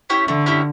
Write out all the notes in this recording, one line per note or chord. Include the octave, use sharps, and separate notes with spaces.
C#4 E4 G4
D3 A3
C#4 E4 G4